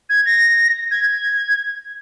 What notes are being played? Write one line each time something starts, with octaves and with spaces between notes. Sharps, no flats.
G#6
A#6
G#6